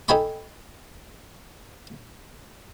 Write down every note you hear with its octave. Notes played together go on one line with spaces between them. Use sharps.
D#4 A4 G5 G#5 B5 C#6